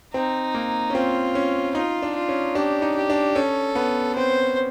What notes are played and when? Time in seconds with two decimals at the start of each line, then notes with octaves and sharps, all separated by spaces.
0.14 C4 D#4
0.55 A#3
0.90 C#4
0.94 C4 F4
1.35 C#4
1.75 D#4 F4
2.03 D4
2.16 F4
2.29 C#4
2.55 D4 G4
2.82 D#4
2.96 G4
3.10 D4
3.35 C#4 A4
3.75 B3
4.16 C4 C5